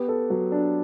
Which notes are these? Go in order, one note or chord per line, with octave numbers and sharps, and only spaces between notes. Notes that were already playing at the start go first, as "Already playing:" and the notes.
Already playing: B3 G4
A4
F#3
D4